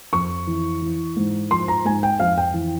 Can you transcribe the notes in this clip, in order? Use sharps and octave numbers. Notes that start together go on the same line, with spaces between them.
F2 C#6
E3
E3
G#2
F3 C6
A#5
G#2 G#5
G5
F2 F5
G5
E3